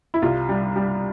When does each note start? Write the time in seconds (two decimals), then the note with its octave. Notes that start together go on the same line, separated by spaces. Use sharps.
0.14 E4
0.22 C2 F4
0.49 G3
0.76 G3